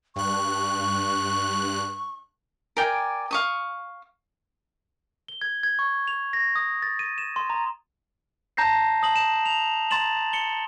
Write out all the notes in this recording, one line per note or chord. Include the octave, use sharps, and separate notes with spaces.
G2 C#6 F#6
A#4 D5 G5 G#5
F5 C#6 D#6
G7
G#6
G#6
C#6
F7
A#6
D#6
A6
D#7
E7
C6
A#5
A5 A#5 G6 A#6 C7
A5 D#6 F#7
E7
F7
A#5 C6 A6 E7 F#7
C#7 G7